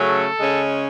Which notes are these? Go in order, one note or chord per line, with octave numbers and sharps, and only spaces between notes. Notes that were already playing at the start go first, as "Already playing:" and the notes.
Already playing: C#3 F#3 A3 C#4
A4
C#3 G#3 C#4